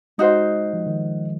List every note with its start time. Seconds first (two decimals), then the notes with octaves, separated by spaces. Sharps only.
0.18 G#3 D#4 F#4 C5
0.73 F3
0.87 D#3